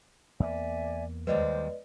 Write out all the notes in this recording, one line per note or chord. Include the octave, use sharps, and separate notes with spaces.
E2 A#3 D5 E5 G#5
D#2 G3 G#3 B4 C5 D5 D#5 D6